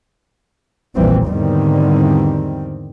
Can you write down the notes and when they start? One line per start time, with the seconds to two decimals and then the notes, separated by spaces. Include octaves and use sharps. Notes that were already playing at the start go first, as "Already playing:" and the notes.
0.96 F1 A#1 E3 G3 C4
1.27 E2 G#2 D3 D#3 G3 C4